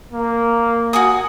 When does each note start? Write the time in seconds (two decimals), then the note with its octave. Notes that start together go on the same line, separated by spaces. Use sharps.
0.12 A#3
0.93 F#4 G#5 D#6